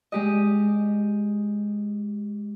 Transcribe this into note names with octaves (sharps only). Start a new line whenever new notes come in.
G#3 G4 D#5